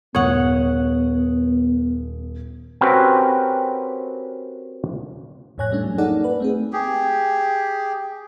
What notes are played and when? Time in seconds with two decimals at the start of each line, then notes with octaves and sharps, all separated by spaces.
0.15 D#1 B3 C#5 F#5 D#6
2.81 C4 C#4 F#4 G4 A#4 B4
5.58 F2 A2 C#5 G#5 F#6 A#6
5.71 G3 A3 C#4 D4
5.84 F#3
5.98 A#3 D#4 G#4 A4 D5 F#5
6.24 B4
6.40 A3 C4 G#4
6.73 G4 G#4